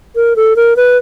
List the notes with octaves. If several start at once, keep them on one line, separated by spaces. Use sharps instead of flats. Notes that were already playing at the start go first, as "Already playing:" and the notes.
A#4
A4
A#4
B4